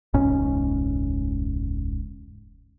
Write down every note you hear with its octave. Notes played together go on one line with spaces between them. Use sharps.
E1 C#2 G#2 C#4